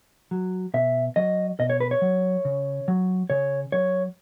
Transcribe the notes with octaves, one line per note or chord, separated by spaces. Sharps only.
F#3
B2 E5
F#3 D#5
B2 D#5
C#5
B4
C#5
F#3
C#3
F#3
C#3 C#5
F#3 C#5